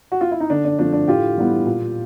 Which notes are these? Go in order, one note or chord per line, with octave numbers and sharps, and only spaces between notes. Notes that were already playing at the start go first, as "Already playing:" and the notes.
F#4
F4
E4
D#4
D3 D4
D4
F3 A3 C4 D4
D4
A2 F4 G4
E3 G3 B3
A#2